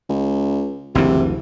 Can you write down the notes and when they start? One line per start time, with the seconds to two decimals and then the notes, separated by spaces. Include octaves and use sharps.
0.10 C#2
0.95 F#1 D2 C3 E3